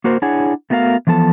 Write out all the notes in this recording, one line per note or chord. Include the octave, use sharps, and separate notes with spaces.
A#3 F#4 A#4 C5
D4 E4 G#4 C#5 F#5 G#5
A3 B3 F#4 A#4 E5 F5
E3 F3 B3 A4 A5